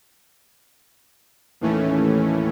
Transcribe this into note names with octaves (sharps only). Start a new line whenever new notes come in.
D#2 A2 E3 A3 C#4